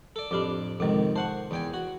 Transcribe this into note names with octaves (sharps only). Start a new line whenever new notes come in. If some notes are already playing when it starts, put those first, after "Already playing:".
A4 D5
F2 A2 D4 G4 D6
F2 C3 D#3 G#3
C5 F#5 A5 C#6
E2 G5 G#5
F#4